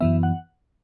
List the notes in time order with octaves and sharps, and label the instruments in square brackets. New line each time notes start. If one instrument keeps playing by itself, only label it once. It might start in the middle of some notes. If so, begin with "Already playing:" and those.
[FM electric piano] F#2 E3 B3 E5
F#5